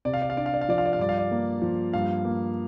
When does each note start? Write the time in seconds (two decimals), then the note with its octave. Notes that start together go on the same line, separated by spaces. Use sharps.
0.05 C3 D5
0.14 F5
0.22 D5
0.30 F5
0.37 D4 D5
0.46 F5
0.54 D5
0.61 F5
0.69 F3 D5
0.78 F5
0.86 D5
0.93 F5
0.99 G2 D5
1.09 F5
1.18 D5
1.31 A#3
1.62 F3
1.93 G2 F5
2.25 A#3